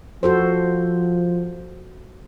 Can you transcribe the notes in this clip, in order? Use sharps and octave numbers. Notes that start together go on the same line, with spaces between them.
F3 F#4 A4 C5